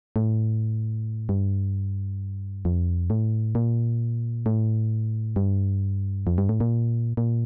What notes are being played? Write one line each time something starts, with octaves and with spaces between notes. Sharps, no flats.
A2
G2
F2
A2
A#2
A2
G2
F2
G2
A2
A#2
A#2